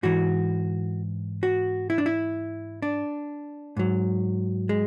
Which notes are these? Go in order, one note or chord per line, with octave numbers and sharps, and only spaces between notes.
G#2 E3 F#4
F#4
E4
D4
E4
D4
G#2 F#3
G#3